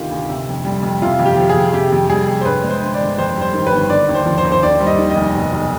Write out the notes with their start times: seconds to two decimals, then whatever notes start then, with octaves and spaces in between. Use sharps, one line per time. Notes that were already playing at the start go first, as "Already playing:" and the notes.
Already playing: D2 C3 D#3 F4 G4
0.11 D2
0.29 C3
0.48 F2
0.65 G3
0.83 F2
1.02 C3 F4
1.19 F2
1.26 G4
1.37 F3
1.49 G#4
1.55 F2
1.73 C3 G4
1.92 F2
2.09 G3 G#4
2.27 F2
2.41 C5
2.45 G2 B4
2.64 G#3
2.70 C5
2.82 D3
2.94 D5
3.00 G1
3.18 F2 C5
3.36 G3
3.41 C5
3.54 D#3
3.67 B4
3.73 G1
3.90 D3 D5
4.09 D#2
4.15 C5
4.26 F3
4.38 C5
4.45 D#2
4.52 C5
4.63 D#2 D5
4.80 G3
4.87 D#5
4.98 D#3
5.10 D#5
5.16 F1
5.35 B2
5.53 B1